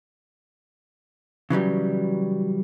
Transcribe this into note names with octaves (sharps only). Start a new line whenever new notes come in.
C#3 E3 F#3 G3